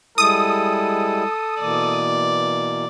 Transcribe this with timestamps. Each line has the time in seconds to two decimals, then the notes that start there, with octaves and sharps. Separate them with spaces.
0.18 G3 G#3 E4 A4 D#6
1.61 B2 E3 A#3 D5